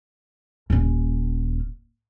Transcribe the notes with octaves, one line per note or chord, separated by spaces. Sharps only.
D#1 C#4